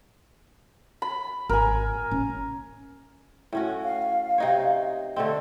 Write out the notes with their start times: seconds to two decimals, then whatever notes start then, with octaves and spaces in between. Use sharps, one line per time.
1.02 B5
1.49 G#1 A#4 G#5
2.11 C#4
3.53 A2 C#4 F#4
3.84 F5
4.38 C3 D#4 C#5
5.16 D3 A3 C4 D#5